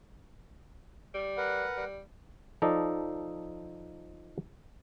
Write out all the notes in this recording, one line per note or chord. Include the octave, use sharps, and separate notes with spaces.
G3
A#4 B4 F#5
G3
F3 D#4 A4 D5 D#5